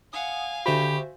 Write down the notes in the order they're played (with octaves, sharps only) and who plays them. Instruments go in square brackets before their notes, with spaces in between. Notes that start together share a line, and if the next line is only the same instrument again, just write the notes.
[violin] F5 G#5 [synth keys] F#5 D#6
[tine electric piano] D3 B5 [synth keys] F#4 C5 E5 [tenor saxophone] G4